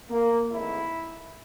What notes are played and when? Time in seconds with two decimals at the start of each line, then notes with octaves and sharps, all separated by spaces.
0.10 A#3
0.51 G#1 G#2 E3 A3 E4